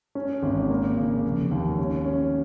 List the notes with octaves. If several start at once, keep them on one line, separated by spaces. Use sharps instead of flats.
C#4
G#1
A#3
C#3
F1
D#2
C#4
C#4